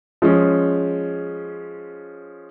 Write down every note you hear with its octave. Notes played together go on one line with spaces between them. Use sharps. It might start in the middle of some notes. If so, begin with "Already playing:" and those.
F3 G#3 C#4